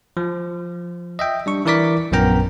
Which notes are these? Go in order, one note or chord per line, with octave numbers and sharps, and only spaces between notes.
F3
D#5 E5 G5
G3 D4 C#6
E3 E4 A#4 D5 D6 B6
A#1 F#2 B3 A#4 G5 A#5